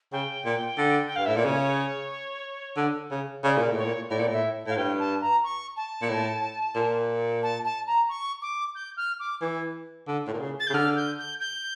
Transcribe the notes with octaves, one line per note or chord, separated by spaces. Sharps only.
C#3 G5
A#2
D3
G5
G2 F5
A2 E5
A#2 D5
C#3 C#5
D3
C#3
C#3 D5
A#2
A2
C#5
A#2
A2 D5
A#2
A2 E5
A2 F5
G2 G5
A5
A#5
C#6
A5
A#2
A2
A#2
A5
A5
A#5
C#6
D6
G6
F6
D6
E3
D3
A2
A#2
C#3
A6
G6
C#3
D3 F6
G6
G6
G6